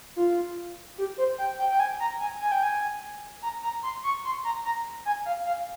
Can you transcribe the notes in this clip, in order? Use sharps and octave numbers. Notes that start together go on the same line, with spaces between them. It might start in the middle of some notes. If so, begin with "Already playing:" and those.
F4
G4
C5
G5
G5
G5
G#5
A#5
G#5
G#5
G5
G#5
A#5
A#5
C6
C#6
C6
A#5
A#5
G#5
F5
F5